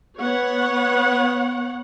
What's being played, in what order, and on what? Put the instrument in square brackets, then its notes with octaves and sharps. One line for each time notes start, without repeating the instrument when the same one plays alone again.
[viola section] B3 C#5 F#5